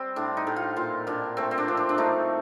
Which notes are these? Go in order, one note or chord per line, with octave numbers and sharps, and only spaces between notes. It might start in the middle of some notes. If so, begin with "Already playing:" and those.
Already playing: G3 C4
A2 D4
D#4
A2
F4
A#2 F4
A#2 D4
A3 C4
C4
D4
F3
D4
D4
A3 D#4